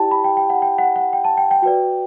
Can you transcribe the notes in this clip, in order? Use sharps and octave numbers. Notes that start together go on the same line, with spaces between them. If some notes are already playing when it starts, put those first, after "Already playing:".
Already playing: E4 G4 D5 G5 A5
B5
G5
G5
F#5
G5
F#5
F#5
G5
A5
G5
G5
F#4 B4 D5 G5